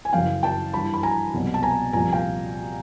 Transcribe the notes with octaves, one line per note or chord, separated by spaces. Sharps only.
G#5
F#2 C#3 E3 F5 G5
G5 A5
G2 E3 A5 B5
B5
G#5 A#5
C2 B2 F#3
A5
G#5 A#5
C2 A#2 F3 G#5 A#5
F5 G5